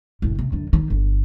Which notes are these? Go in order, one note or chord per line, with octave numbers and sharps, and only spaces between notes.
F#1 A2
C3
F#2 D3
D#3
G1